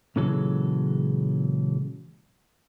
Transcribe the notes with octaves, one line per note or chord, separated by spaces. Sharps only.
A#2 C#3 E3 F#3 G#3 A4